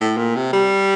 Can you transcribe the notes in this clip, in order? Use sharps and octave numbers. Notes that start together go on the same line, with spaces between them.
A2
A#2
C3
G3